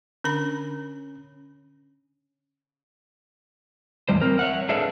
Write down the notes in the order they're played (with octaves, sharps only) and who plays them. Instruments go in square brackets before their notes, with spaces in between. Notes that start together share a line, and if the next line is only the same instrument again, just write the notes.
[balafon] D3 D4 B5 [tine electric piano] C#4
[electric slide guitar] E2 A2 G3 C5
C4 A#4
C#5 E5 F#5
D4 G#4 A4 B4 E5 F5